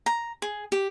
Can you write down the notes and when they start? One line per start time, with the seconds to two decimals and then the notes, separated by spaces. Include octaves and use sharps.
0.06 A#5
0.42 G#4
0.72 G4